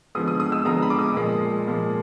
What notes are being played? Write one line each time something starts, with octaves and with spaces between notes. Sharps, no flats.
D3 F3 G#3 B3 D#6
D#6
D#6
E6
D3 F3 G#3 B3 A#5
B5
D6
D#6
A#2 F3 G#3
A#2 F3 G#3